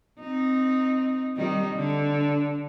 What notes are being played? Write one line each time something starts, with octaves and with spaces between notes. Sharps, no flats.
C4 D#4
D#3 G3 D#4
D3